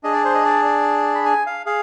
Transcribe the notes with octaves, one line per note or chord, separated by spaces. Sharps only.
D4 G#4 D#5
D5
C5
D#5
D5
D5
B5
G#5
F5
G#4 F5